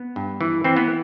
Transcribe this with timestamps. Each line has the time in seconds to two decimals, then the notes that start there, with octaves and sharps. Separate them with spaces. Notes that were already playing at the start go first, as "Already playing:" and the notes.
Already playing: B3
0.16 G2
0.41 E3
0.64 E3 C4
0.77 B3